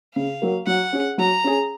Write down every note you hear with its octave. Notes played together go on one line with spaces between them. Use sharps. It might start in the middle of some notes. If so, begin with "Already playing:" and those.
C#3 F5
F#3 A#3
F#3 F#5
C#4 G#4
F#3 A#5
C#4 G#4